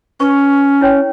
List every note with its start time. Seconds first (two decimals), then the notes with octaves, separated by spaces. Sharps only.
0.20 C#4 B4 C#6
0.81 E4 C#5 G5